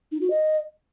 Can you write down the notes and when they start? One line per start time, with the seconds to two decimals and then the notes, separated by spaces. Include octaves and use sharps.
0.12 D#4
0.21 F#4
0.30 D#5